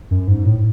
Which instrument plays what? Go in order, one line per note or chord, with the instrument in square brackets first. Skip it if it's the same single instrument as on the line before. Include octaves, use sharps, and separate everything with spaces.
[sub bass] F#2
G#2
A2